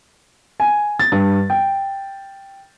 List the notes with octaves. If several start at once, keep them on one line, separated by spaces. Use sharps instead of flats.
G#5
A6
G2
G5